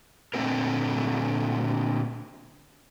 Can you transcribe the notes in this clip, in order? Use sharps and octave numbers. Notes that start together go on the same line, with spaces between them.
A#2 D3 A3 C4 G#4 A#4